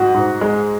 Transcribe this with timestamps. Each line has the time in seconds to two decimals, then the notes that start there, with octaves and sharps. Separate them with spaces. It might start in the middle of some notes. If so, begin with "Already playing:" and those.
Already playing: G#2 F#4
0.14 G#2
0.41 G#3